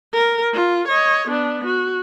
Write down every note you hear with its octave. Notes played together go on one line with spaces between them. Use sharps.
A#4
F4
C#5 D#5
B3 D4
F#4